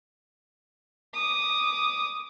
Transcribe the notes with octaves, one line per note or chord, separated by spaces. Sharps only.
D6 D#6